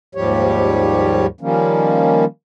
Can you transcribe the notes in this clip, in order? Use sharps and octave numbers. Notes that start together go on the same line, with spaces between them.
D#2 G#2 F3 G3 G4 C#5
D#3 F3 G3 A#3 C#4